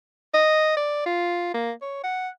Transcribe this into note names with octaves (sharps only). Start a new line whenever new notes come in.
D#5
D5
F4
A#3
C#5
F#5